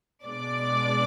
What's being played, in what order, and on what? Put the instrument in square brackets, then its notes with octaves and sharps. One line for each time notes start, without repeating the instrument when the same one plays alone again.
[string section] B2 G#3 B3 D4 D5 D6